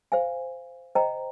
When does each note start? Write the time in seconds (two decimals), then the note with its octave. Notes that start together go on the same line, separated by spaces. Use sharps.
0.12 C5 F5 G#5
0.95 C5 D#5 G5 A#5